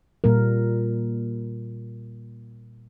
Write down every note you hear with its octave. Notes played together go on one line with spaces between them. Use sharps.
A#2 G3 A#3 A#4